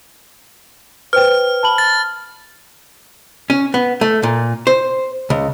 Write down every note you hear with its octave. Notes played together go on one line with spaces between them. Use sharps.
B4 C5 G5 F6
A5 B5 F#7
A6
C#4
B3
A3
A#2
C5
C#2